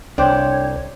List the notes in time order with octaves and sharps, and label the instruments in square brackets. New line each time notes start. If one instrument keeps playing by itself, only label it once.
[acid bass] C2 [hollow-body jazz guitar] D4 C5 [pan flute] C#5 [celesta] G5 D6 G6